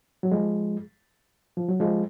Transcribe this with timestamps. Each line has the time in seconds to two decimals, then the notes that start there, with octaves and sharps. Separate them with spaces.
0.23 F#3
0.32 F3 G#3
1.57 F3
1.68 F#3
1.80 F3 G#3